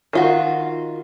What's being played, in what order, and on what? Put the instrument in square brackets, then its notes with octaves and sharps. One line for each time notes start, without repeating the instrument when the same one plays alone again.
[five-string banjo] D#3 F4 F#4